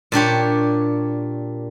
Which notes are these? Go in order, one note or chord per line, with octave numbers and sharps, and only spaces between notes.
A#2 D4 G4 C#5